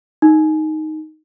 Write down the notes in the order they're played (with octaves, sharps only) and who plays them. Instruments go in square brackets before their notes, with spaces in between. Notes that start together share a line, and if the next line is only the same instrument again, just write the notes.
[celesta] D#4